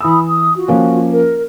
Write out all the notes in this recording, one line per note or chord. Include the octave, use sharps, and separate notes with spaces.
E3 B5 D#6 E6
D#6
F4 F#4
F3 A#3 C#4
A#4